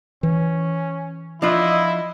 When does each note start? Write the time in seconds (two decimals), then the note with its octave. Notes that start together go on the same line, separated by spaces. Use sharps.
0.23 E3 C#4
1.42 F3 D4 E4 F4 D#5